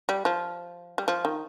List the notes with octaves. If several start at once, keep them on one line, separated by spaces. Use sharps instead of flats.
G3
F3
G3
F3
D#3